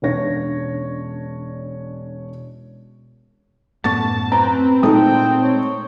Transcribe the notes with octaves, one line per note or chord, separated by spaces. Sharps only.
E1 C#4 D4 C#5 A#6
F#2 A2 B3 A5 C#6 A6
C4 B4 A#5
A#2 G#3 A3 D#4 A4 G5 D#6
C#5